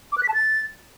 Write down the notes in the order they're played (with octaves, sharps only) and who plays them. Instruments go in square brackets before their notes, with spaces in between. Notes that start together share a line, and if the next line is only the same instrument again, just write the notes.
[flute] D6
F#6
B6
A5
A6